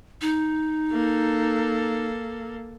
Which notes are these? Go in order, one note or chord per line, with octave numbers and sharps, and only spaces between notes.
D#4
A#3 A4